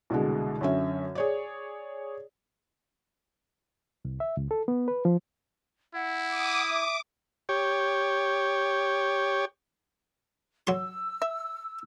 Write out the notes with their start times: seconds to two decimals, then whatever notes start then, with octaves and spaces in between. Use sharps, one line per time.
0.10 C2 B2 D3 G#3
0.61 F#2 D3 C#4 E5
1.15 G#4 C#5 D5
4.05 C2
4.20 E5
4.37 C#2
4.51 A4
4.68 B3
4.88 B4
5.05 F3
5.95 E4 F#5
6.28 D6 D#6
6.71 E5 D6
7.49 G4 C#5
10.67 F#3 C6 E6
11.22 E5